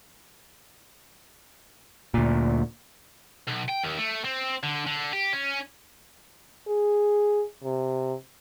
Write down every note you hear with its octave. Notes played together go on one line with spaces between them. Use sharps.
D2 A#2
B1
G5
D#2
A3
C4
D3
D3
G4
C#4
G#4
C3